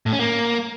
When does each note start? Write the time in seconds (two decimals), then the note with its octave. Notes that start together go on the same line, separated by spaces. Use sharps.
0.06 A2
0.13 C#4
0.19 A#3